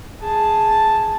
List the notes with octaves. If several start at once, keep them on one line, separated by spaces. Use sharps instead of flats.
G#4 A5